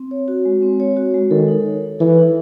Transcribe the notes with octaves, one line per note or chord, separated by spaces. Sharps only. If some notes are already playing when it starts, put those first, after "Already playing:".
Already playing: C4
C#5
F#4
G#3
C4
C#5
F#4
G#3
D#3 A4
D#4
C#5
D#4
E3 A4
D#4